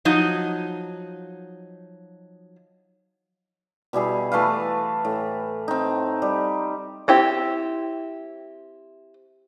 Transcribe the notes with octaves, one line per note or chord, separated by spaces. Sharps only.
F3 F#3 D#4
B2 G3 E4 G#4
E3 A3 B4 F5
A2
C4 D#4
G3
C4 E4 G4